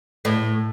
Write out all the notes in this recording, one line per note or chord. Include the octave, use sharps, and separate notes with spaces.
A2